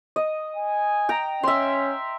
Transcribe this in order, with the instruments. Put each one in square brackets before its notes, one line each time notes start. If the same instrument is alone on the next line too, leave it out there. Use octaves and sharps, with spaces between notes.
[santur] D#5
[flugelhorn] G#5
[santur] G5 A#5
[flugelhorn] C#4 [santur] E5 C6